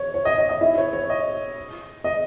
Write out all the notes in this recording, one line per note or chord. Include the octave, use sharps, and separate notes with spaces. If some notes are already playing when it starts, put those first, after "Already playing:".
Already playing: C#5
C#5
D#5
D#5
D#5
E4 E5
C#5
C#5
D#5
D#5